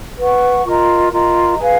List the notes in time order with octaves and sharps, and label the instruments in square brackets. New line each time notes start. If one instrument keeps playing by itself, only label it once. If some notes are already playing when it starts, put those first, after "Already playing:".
[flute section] B4 F#5 C#6
F4 A#4 D#5 A#5
F4 A#4 D#5 A#5
G#4 B4 F5